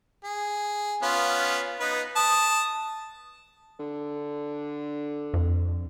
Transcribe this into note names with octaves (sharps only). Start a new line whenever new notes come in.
G#4
B3 C#4 F4
B3 D#4 B4
A5 D#6
D3
F2